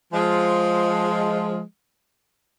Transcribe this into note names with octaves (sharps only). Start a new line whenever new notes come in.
F3 G#3